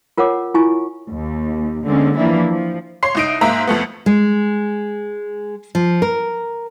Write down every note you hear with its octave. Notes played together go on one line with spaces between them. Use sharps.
F4 A#4 C#5 F#5 G#5 D6
E4 F4 G#5 C#6
D#2
D3 G#3 A#3 C4 C#4
E3 F3 A#3 D4 E4
F3
C#5 C6 C7
C2 D#4 D7
G#2 A#3 E5 A#5
F2 A3 B3
G#3
F3
A#4